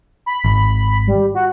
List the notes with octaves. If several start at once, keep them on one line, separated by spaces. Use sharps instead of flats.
B5
G#1
G3
F#4